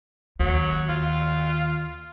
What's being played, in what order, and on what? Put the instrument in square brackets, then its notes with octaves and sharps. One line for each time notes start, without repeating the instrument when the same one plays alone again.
[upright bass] D#2 [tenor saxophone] F#3
[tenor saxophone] F4